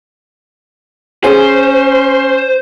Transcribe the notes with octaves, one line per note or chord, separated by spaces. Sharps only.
C#4 G#4 C5 G#5